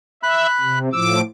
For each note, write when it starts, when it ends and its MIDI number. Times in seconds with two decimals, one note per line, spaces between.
0.23 0.47 76
0.23 0.79 83
0.23 0.79 90
0.61 0.89 48
0.93 1.21 45
0.93 1.21 53
0.93 1.21 86
0.93 1.19 88